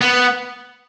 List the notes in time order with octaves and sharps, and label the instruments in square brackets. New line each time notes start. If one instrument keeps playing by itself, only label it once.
[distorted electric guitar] B3